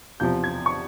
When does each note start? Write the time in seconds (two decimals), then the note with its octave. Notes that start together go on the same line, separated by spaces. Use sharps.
0.20 E2 C3 F3 G6
0.44 G#6
0.66 C#6